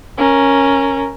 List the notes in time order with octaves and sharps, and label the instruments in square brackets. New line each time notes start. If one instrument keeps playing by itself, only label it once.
[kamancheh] C#4 A#4